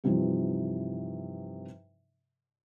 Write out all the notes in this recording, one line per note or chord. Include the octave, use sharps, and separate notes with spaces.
G2 C3 E3 F3 D#4